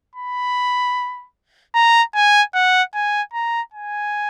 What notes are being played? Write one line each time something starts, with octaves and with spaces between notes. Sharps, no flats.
B5
A#5
G#5
F#5
G#5
A#5
G#5